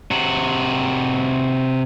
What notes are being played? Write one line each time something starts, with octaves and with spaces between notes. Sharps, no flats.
C3 F#4